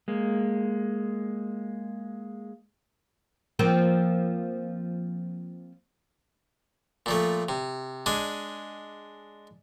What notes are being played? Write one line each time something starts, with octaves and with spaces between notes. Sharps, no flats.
G#3 A#3
F3 A#3 C4
A#2 F3 A3
C3
G#3 D4 G#5